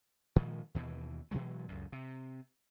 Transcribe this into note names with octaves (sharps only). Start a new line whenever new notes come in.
A#2 D#3 F3 G#3
D#2 B2 E3
B2 E3 F#3 G#3
C#2 F#2
C3